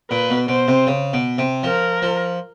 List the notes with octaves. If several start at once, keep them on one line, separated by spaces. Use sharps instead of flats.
A#2 B4
B2
B2 C5
C3
C#3
B2
C3
F3 A#4
F3